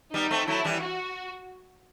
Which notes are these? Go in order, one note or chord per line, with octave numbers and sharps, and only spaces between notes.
G3 B3 D#4
A3 C4
F#3 A3 E4
E3 G3
F#4